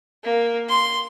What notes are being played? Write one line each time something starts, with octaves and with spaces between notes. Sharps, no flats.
A#3
C6